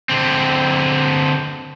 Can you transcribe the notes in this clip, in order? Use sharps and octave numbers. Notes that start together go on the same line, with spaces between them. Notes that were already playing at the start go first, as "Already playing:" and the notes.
D3 C4